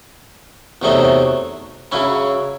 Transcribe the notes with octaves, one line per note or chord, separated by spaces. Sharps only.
E2 C3 F#3 A3 D#4
C#3 F#3 C#4 E4